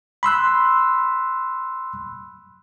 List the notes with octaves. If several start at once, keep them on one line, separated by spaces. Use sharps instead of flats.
B5 C6 E6 F#6